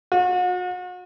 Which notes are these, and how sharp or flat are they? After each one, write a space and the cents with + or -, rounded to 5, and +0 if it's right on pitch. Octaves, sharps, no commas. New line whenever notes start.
F#4 -40